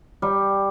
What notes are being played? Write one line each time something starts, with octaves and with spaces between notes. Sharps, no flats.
G3